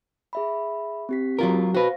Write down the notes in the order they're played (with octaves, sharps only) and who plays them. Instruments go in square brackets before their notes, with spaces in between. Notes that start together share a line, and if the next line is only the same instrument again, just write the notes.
[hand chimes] G#4 E5 B5
C4 G4 B6
[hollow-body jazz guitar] F#3 F4 A#4
[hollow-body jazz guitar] F#4 B4 [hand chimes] C5 F5 A#6